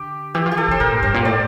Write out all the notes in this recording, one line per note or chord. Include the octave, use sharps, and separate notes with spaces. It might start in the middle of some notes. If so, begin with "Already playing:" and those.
Already playing: D3 G4
E3 G4
F3
G4
E3 A4
D3 C5
A#2 A#4
A2
G2 C5
A#2
A2 D5